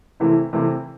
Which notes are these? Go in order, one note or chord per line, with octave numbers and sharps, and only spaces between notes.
C3 E3 A3 E4
C3 E3 A3 E4